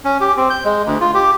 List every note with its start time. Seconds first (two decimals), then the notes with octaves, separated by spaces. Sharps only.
0.05 C#4
0.21 G4
0.37 C4
0.50 G6
0.65 G#3
0.86 D2
1.01 F4
1.14 G4